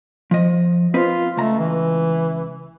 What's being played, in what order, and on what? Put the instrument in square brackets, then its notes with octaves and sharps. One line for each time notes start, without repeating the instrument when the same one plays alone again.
[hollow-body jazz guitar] F3 D#5
[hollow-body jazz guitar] C4 B4 D#5 [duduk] F4
[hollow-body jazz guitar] C#2 A#5 [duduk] A3
[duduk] E3